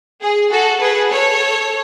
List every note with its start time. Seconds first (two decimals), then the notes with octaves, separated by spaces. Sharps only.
0.21 G#4
0.50 F#4 A4
0.80 G#4 B4
1.11 A4 C#5